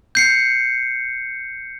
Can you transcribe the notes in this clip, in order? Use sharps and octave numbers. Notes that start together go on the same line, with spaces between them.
G6 C7 C#7